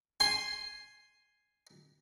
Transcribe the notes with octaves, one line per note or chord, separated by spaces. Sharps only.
G#5 C6